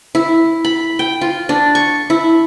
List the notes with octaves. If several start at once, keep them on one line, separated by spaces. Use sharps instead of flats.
E4
B5
G5
F4
D4
C#6
E4